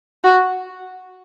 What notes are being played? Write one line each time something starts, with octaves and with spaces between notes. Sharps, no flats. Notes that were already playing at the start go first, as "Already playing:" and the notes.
F#4